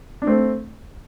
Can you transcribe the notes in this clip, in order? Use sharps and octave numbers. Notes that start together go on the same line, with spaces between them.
D4
A3 C4